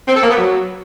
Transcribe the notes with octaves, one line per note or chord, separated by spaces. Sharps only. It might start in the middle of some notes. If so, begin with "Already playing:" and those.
C4
A4
A#3
B3
F#3